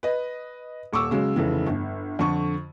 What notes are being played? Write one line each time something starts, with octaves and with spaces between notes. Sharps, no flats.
B4 D#5
D#1 C#6 D6 E6
C#3 F#3 G#3
F1 C#3 E3
G1
F2 D3 C#6